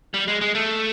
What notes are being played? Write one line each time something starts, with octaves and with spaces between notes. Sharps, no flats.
G3
G#3
G#3
A3